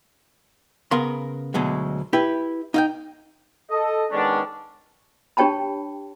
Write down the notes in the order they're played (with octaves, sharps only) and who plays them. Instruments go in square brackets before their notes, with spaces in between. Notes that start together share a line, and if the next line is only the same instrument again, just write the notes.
[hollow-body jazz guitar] C#3 B3 A#4 F5 C6
D2 B2 F#3 G#3
E4 G4 B4
D#4 F5 G5
[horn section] A4 D#5
D#3 G#3 B3 C#4 D4
[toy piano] D4 G4 C#5 G5 A5 B5